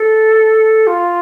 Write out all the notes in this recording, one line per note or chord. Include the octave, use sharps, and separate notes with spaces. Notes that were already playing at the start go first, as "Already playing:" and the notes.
Already playing: A4
F4